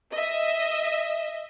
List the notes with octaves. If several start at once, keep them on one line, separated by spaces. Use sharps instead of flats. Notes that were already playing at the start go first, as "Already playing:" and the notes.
D#5 E5